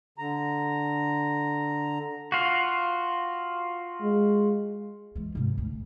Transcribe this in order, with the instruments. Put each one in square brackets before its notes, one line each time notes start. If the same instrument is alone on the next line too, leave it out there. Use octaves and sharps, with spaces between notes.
[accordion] D3 A#5
[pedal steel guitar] F4 F#4
[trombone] G#3
[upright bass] E3 G#3
G#2 C3
D2